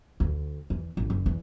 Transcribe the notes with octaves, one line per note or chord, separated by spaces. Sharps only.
D2
E2
A1
F#1
E2